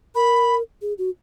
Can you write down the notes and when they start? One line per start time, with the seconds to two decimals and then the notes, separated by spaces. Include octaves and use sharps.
0.15 A#4 B5
0.82 G#4
0.98 F#4